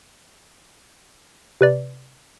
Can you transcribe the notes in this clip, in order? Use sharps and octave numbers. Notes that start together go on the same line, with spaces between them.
C3 B4 D5